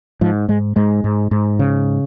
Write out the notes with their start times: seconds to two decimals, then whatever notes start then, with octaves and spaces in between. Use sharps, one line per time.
0.21 G#2 F3
0.48 G#2 G#3
0.76 G#2 G#3
1.04 G#2
1.31 G#2
1.59 C#3